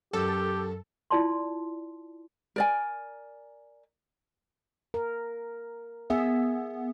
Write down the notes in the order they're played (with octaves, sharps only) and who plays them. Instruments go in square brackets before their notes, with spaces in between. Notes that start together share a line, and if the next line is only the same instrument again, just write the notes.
[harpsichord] F#2 [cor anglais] G4 [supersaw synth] A4
[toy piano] E4 F4 D5 A5 C6
[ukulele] A#4 D5 G#5
[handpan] A#4
[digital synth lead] B3 [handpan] G#4 E5